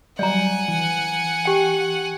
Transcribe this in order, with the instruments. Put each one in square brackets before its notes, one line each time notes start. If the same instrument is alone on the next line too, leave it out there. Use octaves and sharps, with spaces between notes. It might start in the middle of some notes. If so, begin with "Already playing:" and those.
[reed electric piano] F#3 G3 [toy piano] D5 A#5 [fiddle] F#5 G#5
[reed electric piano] E3
[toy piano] G4 G5